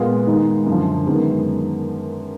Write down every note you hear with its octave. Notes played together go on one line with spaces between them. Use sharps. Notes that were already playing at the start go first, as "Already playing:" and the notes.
Already playing: A#2 G#3 B3 F4
D#3 G#3 D#4
F#2 D3 F3
F#2 D#3 G#3 B3